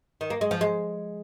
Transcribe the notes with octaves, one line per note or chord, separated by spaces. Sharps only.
D#3
A#3
G#3
F3
G#3